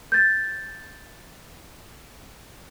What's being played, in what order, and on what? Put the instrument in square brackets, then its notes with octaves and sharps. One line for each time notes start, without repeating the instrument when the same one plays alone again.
[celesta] G6 A6